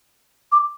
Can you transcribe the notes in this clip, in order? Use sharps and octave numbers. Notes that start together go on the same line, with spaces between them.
D6